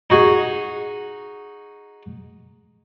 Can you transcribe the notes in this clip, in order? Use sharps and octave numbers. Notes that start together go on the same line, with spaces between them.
D#4 F#4 G#4